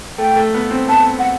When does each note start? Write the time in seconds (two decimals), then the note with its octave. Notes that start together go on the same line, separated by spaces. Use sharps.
0.18 A3 G5
0.36 A3
0.54 B3
0.71 C4
0.89 B3 A5
1.19 F#5